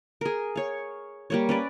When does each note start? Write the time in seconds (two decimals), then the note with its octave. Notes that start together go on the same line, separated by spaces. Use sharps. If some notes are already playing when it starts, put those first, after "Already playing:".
0.21 G#4 A#4
0.56 C#5 F5
1.30 G3 A#3 C#5
1.49 C#4 B4 D5